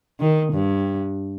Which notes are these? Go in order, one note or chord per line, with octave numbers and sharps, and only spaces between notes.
D#3
G2